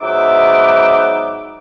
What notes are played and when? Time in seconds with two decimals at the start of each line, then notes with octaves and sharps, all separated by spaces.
0.01 G#2 F#3 B3 D#4 E5 D6